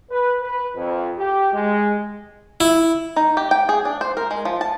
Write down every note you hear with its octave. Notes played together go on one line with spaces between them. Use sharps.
B4
B4
F2
G4
G#3
E4
D#4
G4
G5
G#4
D4
C5
A#4
G#3
F3
A5